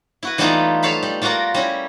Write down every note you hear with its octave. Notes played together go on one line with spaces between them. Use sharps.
E4 F#4 B4
E3 G3 A3 B3 D#4 F4
A4 C#5 F5 B5
G3
G3 F4 F#4 A#4 D5
G3 C#4 E4